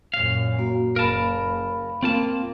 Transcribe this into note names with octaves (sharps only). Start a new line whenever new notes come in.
F#2 A#2 F5
A#3 F#4
F#1 A#4 F5 A5 B5
A#3 C4 F4 A5